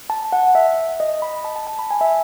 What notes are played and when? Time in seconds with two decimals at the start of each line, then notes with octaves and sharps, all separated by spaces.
0.10 A5
0.32 F#5
0.55 E5
1.00 D#5
1.22 B5
1.45 A5
1.56 A5
1.67 A5
1.79 B5
1.91 G#5
2.01 E5